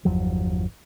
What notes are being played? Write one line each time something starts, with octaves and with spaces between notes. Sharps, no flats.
G1 E2 F3 F#3